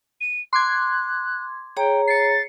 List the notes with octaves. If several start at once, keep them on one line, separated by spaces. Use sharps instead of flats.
D#7
C6 D6 F#6 G#6
G#4 C#5 G5 A#5
A6 C7 C#7